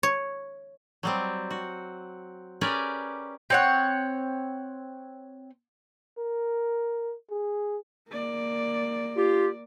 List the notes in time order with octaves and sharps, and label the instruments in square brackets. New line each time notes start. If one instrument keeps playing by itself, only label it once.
[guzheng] C#5
[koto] F#3 G3 C4
F#4
C#4 G4 G#4 A#4 B4 D5
[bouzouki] C4 C#5 F#5
[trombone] A#4
G#4
[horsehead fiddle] A#3 D5
[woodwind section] F4 G4